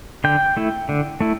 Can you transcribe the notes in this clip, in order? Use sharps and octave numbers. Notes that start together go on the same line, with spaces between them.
D3 G5
A3 E4
D3
A3 E4